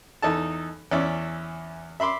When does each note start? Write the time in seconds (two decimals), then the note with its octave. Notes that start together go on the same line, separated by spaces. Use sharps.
0.22 E2 D#4 A4 A5
0.91 E2 C#4 D5 E5
2.00 E5 B5 C6 D6